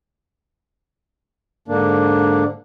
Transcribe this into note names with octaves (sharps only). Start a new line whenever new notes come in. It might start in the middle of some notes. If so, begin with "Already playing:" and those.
G#2 D3 A#3 D4